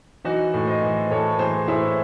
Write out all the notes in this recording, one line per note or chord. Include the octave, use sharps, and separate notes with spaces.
E3 D#4 F#4
A2
C5 D#5
E3
A2 A4 C#5
E3 G#4 C5
A2 E4 G#4